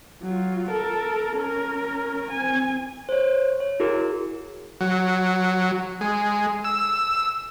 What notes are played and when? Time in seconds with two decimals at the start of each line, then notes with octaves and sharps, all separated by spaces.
0.22 F#3 F4
0.69 A4 A#4
1.36 C#4 A#4
2.32 C4 G#5
3.09 C5 C#5
3.60 C#5
3.80 E4 F#4 G#4 A#4
4.81 F#3
6.01 G#3
6.65 E6